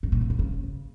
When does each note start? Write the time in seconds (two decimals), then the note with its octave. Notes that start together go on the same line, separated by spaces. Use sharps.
0.03 G2
0.12 A#2
0.21 F#2
0.30 E2
0.39 C#3